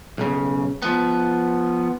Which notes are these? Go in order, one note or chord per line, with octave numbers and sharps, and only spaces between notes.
B1 C#3
F3 B3